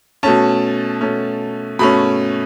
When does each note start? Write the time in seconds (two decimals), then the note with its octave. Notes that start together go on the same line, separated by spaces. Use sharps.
0.23 B2 A3 C#4 A5
1.01 B2 A3 C#4
1.79 B2 A3 C#4 B5